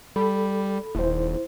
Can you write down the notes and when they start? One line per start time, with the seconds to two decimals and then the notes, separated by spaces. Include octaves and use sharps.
0.16 G3 A4 B5
0.95 D#1 E4 C5